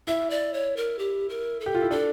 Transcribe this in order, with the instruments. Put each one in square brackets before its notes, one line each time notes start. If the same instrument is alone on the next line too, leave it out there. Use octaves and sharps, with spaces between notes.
[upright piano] E4 [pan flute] E5
[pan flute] D5
C#5
A#4
G4
A#4
A4
[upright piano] G4
F4
E4
[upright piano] D4 [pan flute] A4